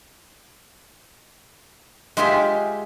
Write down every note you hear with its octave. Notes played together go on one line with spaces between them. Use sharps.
G#3 F4 G4 E5 G#5